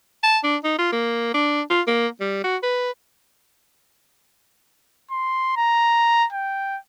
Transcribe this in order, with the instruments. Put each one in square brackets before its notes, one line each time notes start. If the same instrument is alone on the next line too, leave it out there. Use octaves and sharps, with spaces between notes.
[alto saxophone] A5
D4
D#4
F4
A#3
D4
F4
A#3
G3
F#4
B4
[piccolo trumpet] C6
A#5
G5